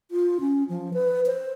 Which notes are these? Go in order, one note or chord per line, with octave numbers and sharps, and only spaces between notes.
F4
C#4
F3
B4
C5